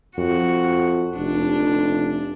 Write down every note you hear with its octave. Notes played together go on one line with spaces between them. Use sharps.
F2 F#4
F1 D4